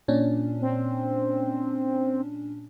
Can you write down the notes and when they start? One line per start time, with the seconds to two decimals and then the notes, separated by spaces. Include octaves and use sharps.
0.08 A#2 C#4 D4
0.61 C4